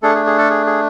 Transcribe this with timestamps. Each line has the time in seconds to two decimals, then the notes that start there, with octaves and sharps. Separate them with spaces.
0.02 A3 D4 G#4 A4
0.15 G#4
0.26 G#4
0.38 A4
0.50 G#4
0.66 G#4